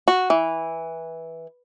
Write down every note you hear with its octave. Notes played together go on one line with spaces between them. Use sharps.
F#4
E3